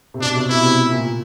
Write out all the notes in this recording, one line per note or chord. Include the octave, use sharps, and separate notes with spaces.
C3
B2 D4
C3
B2 E4
C3
A#2